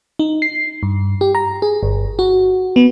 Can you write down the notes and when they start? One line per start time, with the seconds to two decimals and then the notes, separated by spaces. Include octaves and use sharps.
0.19 D#4
0.42 C7
0.83 G2
1.21 G4
1.35 A#5
1.62 G#4
1.83 G1
2.19 F#4
2.76 B3